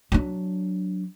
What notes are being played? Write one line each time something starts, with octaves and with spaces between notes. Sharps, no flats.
F#3 D4